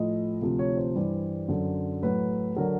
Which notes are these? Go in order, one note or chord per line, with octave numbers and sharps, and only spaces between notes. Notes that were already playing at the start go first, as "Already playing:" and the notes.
Already playing: A2 F3 D#5
D2 C3 F3
C#5
C5
G2 E3 G3
F#2 D3 F#3
A2 F#3 B4
D3 F#3 A#4